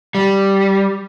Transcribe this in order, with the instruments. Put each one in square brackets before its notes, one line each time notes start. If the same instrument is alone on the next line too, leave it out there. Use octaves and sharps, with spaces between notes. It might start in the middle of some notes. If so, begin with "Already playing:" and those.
[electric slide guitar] G3